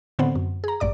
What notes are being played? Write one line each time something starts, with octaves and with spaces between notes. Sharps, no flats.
A2 D3 B3 C4 C5 F#5
F#2
G#4 A#5
A1 G2 D5 D6